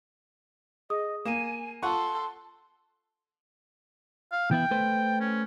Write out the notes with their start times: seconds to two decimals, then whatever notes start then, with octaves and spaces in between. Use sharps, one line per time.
0.90 G#4 D#5 D#6
1.25 A#3 G#5 D#7 E7
1.83 F4 A4 F#5 C6 C#6
4.32 F5
4.51 E3 B3 E4 G5
4.71 A3 B4 C5
5.20 C#4